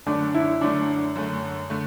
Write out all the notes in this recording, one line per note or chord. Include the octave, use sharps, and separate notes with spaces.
F#2 D3 A3 D4
E4
F#2 D3 A3 D4
F#2 D3 A3
D3 A3